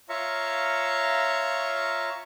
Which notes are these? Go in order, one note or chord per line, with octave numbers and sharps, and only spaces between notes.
F4 C#5 E5 F5 A#5 C#6